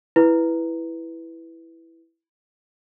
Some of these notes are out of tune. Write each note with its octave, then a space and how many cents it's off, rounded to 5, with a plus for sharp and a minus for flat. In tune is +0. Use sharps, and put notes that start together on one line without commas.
E4 +0 B4 +0